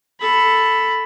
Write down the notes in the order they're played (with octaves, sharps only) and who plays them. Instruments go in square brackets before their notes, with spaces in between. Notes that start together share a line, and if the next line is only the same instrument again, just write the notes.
[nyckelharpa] A4 B5